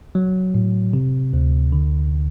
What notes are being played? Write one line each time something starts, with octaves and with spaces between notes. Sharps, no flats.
F#3
A2
C3
D2
D3